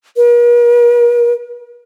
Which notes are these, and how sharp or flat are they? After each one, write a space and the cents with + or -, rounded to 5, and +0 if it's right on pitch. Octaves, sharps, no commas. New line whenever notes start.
A#4 +45